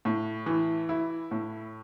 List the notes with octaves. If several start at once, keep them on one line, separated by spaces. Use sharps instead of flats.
A2
E3
E4
A2